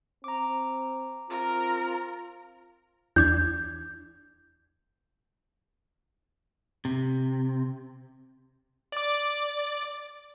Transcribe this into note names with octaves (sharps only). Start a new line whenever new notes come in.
C4 A#5 D6
C4 F4 A#4
E2 D4 G6 G#6
C3
D5 D6